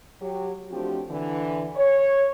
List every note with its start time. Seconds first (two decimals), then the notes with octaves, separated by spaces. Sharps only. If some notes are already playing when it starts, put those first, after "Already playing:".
0.22 F#3 G4
0.70 F3 A3 C4 D4 F#4 G4
1.09 D3 E3
1.76 C#5